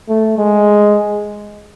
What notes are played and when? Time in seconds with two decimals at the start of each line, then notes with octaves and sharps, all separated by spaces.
0.09 A3
0.38 G#3